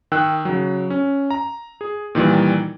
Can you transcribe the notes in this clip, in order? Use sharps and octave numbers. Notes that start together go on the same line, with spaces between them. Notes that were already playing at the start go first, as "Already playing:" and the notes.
D#3 G5 E6 F#6
C#3 F#3
C#4
A#5
G#4
A#2 D#3 E3 G3